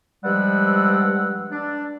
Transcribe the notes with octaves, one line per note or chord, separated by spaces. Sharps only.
G2 F3 G3 G#3 F#5 E6
D4